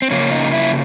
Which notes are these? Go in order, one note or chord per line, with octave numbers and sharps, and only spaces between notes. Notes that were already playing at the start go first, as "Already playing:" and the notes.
C4
C#3 F3 A#3 C#4
D#4
E4